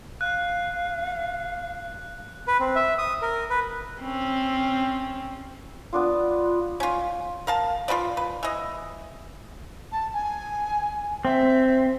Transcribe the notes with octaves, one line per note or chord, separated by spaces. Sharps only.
F5 F#6
B4
C4
E5
D#6
A#4
B4
C4 C#4
B3 D4 F4
C#4 F4
A#4 F5 A5
F4 F#4 B4 D5
B4
E3 D#5
A5
G#5
C4 E5